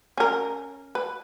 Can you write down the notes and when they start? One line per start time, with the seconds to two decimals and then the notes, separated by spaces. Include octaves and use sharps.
0.18 C#4 A#4
0.95 B4